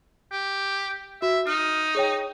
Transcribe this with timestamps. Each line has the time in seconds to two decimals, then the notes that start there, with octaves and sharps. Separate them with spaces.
0.32 G4
1.22 F#4 E5
1.47 D#4 F6
1.95 G#4 C#5 G5